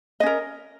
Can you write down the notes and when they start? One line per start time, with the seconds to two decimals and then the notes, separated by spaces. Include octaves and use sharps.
0.20 D#5
0.23 C#4
0.26 A#4